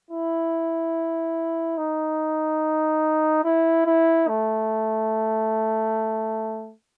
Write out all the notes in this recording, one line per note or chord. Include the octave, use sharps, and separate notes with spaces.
E4
D#4
E4
E4
A3